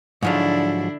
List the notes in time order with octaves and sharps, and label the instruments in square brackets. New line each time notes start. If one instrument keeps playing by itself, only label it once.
[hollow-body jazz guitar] G#2 F3 F#3 [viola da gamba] D3 D4 E4